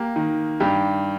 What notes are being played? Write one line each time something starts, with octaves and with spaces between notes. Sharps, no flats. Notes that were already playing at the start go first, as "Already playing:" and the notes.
Already playing: A#3 G4
D#3
G2 G4